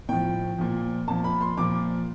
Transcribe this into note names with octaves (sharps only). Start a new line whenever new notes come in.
A2 F3 G5
A#2 F3
A#2 F3 A5
B5
C6
A#2 F3 D6